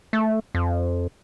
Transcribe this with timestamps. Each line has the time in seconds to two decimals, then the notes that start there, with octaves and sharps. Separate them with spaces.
0.13 A3
0.55 F2